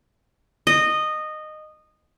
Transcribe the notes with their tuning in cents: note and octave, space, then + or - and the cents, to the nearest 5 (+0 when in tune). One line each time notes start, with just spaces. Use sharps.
D#5 -15